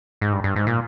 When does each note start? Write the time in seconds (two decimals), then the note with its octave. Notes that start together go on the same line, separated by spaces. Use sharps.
0.21 G#2
0.33 G2
0.44 G2
0.56 G#2
0.67 A#2